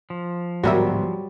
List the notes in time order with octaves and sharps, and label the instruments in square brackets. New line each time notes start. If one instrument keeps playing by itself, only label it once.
[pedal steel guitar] F3
[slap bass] D1 G#2 B3 [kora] F#3 G3 [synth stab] F#4 A#4 E5